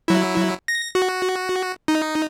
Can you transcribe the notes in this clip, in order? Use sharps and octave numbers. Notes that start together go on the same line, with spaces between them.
F#3 E4
A#6
F#4
D#4